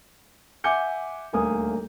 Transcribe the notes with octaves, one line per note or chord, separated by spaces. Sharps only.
E5 F#5 G#5 D6 G6 C#7
D#1 D2 A#3 G#5 D#6